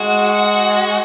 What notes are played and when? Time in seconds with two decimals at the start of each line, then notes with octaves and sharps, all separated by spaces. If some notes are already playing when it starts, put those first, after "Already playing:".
Already playing: G#3 F#4